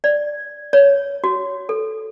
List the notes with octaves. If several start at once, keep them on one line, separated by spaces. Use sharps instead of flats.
D5
C#5
F#4
A4